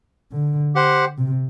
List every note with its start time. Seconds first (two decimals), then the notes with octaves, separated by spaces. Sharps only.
0.32 D3
0.75 G4 C5 F#5
1.18 C3